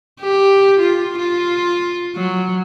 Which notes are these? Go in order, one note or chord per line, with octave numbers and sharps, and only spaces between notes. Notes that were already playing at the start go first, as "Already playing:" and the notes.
G4
F4
F4
F#3